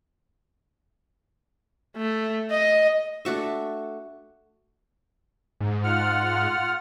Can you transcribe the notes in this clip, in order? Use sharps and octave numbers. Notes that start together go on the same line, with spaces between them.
A3
D#5
A3 D4 F#4 E5
G#2
F4 F#5 F6